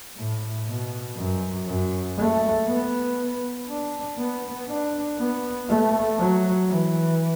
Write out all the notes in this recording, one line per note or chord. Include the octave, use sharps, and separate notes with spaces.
A2
B2
F#2
F#2
A3
B3
D4
B3
D4
B3
A3
F#3
E3